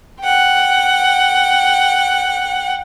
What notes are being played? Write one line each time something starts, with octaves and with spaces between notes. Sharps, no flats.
F#5 G5